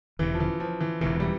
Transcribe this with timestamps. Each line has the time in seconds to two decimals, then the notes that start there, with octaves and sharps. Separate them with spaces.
0.19 E1 E2 C3 E3
0.34 F3
0.40 E3
0.60 F3
0.80 E3
1.01 E1 E2 C3 E3
1.20 G3